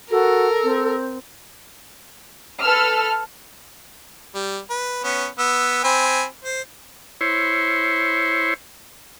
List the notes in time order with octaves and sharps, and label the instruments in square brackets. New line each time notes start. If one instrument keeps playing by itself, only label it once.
[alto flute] F#4 [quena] A4 [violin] A#4
[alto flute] C4
[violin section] A4 B4 E6 F6
[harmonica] G3
B4
B3 C#4
B3 E6
C4 G#5 B5
C5
[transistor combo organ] E4 C5 C#5